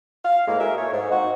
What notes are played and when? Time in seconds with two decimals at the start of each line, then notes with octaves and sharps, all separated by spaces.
0.24 F5
0.47 E2 A2 G#3 A#3
0.59 F#4 G#4 A#4 D#5 E5
0.77 A3 A#3 C#5
0.92 G#2
1.11 A#3 C4 D#4 F#4